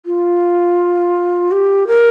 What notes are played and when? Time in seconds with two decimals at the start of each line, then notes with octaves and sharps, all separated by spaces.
0.06 F4
1.51 G4
1.87 A#4